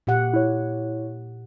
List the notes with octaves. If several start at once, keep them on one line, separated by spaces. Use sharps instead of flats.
A#2 G4 F#5
E4 C#5